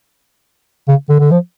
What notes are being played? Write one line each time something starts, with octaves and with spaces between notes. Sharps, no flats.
C#3
D3
D3
F3